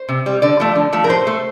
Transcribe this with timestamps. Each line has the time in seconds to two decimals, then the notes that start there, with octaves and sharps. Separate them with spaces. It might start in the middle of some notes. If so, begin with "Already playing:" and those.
Already playing: C5
0.09 C3
0.26 G3
0.42 D3 D5
0.60 F3 A3
0.75 D3
0.93 F3 A3
1.04 A#4
1.09 A2 C5
1.27 A3